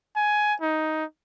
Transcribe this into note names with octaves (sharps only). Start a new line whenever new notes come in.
G#5
D#4